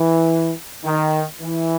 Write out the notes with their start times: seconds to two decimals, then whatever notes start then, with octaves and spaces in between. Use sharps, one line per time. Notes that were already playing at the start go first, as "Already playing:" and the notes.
Already playing: E3
0.84 D#3
1.40 E3